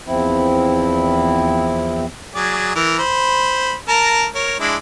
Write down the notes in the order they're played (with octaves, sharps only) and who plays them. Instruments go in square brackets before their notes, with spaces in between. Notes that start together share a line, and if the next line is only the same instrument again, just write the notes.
[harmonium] E2 F3 C4 E4
[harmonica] F#3 G#4 D5
E3 A#4
C5 B5
A#4 A5 A#5
A#4 C#5
G#3 D4 E4